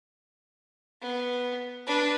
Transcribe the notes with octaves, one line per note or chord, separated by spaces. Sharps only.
B3
D4 B4